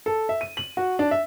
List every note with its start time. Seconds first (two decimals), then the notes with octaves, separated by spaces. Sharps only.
0.06 A4
0.29 E5
0.41 D#7
0.57 F#7
0.77 F#4
0.99 D4
1.11 E5